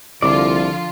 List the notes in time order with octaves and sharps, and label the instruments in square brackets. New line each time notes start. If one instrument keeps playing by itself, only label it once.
[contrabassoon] C2 [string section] D3 F3 F4 [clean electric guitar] D5